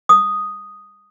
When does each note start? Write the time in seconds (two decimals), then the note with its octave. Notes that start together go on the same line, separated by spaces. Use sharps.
0.09 D#6